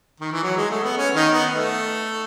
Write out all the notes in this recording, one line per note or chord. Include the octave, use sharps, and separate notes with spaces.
D#3
E3
F#3
G#3
A3
B3
C#4
D#3 D#4
B3
A3